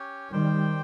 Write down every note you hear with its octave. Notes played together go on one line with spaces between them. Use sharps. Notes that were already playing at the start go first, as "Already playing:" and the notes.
Already playing: C#4 G4 C#5
D#3 G3 G4 C5 G5